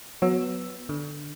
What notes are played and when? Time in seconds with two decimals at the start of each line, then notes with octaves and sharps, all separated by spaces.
0.22 F#3 B3 E6
0.89 D3